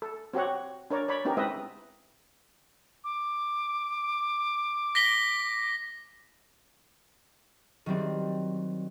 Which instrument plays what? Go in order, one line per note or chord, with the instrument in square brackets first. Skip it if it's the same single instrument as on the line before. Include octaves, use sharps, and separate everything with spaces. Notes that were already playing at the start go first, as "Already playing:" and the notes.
[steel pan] A4
C4 F#4 G4 C#5 F#5
D4 A#4 C#5 D5
C#5 D5 B5
B3 C#4 D#4 G4 A#4
G#3 C4 E4 B4 D#5 E5
[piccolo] D6
[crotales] A#6 B6 G7
[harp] D#3 F#3 G3 C4